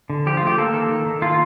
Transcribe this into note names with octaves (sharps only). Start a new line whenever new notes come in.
D3
F3 G4
F4
A3 G4
A#3 A4
D#3 A4
D#3
D#3
A#3 F4